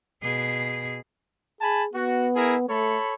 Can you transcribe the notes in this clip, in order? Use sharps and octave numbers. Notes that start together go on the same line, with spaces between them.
B2 G#4
G#4 G#5 A5 B5
B3 F#4
E4 G#4 A#4
A3 A4 C#5 B5